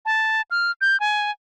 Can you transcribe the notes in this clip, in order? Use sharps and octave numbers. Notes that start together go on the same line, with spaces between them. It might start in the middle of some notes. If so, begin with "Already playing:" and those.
A5
F6
G6
G#5